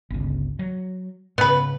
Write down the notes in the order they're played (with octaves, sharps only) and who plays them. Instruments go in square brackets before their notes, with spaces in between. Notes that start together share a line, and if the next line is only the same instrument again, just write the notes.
[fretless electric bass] G1 C#2
F#3
[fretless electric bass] G#2 C#3 [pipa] B3 B4